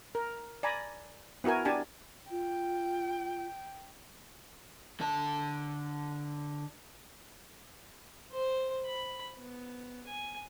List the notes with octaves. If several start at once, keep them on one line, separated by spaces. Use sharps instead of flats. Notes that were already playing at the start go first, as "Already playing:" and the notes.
A#4
D5 G#5 A#5 B5
B3 E4 F#4 A#4 G#5
D4 G4 G#5 A5
F4 G5
D3 A5
C5
B5
B3
G#5